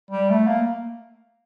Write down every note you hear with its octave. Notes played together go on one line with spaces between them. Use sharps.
G3
A3
A#3